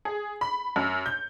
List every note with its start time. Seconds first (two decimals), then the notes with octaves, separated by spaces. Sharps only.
0.05 G#4
0.41 B5
0.76 F#2
1.06 G6